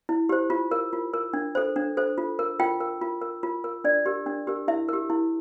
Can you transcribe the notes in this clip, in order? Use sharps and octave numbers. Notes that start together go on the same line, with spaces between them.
E4
G4 C5
F4
A#4
F4
A#4
D4
A4 C5
D4
A4 C5
F4
A#4
F4 G5
A#4
F4
A#4
F4
A#4
D4 D5
G4 A#4
D4
G4 A#4
E4 E5
G4 A#4
E4